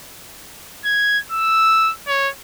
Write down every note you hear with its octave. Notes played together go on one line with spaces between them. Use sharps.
G#6
E6
C#5